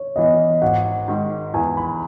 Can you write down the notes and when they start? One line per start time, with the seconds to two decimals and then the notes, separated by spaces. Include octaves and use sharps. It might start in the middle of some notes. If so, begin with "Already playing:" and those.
Already playing: C#5
0.16 E3 B3 D#5
0.62 G#1 F#5
1.08 G#2 D#3
1.54 E2 G#5
1.77 B5